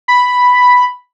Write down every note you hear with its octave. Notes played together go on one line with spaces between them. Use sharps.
B5